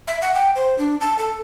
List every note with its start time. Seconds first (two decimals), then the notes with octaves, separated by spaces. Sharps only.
0.07 E5
0.22 F#5
0.35 G5
0.55 C5
0.78 D4
1.01 A5
1.19 A4